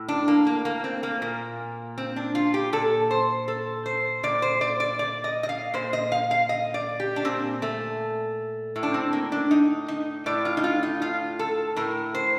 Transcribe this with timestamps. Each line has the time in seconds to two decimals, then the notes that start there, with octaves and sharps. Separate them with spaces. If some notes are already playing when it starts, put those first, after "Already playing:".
Already playing: A2
0.08 D4
0.28 A#3
0.47 A#3
0.65 A#3
0.84 C4
1.03 A#3
1.22 A#2
1.98 C4
2.16 D4
2.35 F4
2.54 G4
2.73 A#2 A4
3.11 C5
3.48 A4
3.86 C5
4.23 A#2 D5
4.42 C5
4.61 D5
4.80 D5
4.99 D5
5.24 D#5
5.43 D#5
5.49 F5
5.74 A#2 C5
5.93 D#5
6.12 F5
6.31 F5
6.49 D#5
6.74 D5
7.00 G4
7.16 D4
7.25 A#2 C4
7.62 A3
8.76 A2
8.83 D4
8.94 C4
9.13 A#3
9.32 D4
9.51 D#4
9.88 D#4
10.26 A2 D5
10.45 F4
10.57 D#4
10.64 F4
10.83 D#4
11.02 F4
11.39 A4
11.76 A2 A#4
12.15 C5